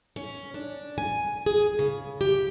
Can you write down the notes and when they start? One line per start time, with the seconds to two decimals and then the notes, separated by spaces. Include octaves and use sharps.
0.16 C#4
0.54 D4
0.98 G#5
1.46 G#4
1.79 C#3
2.21 G4